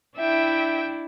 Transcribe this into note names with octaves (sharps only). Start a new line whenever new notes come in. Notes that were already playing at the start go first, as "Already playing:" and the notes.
D4 E4 E5 G5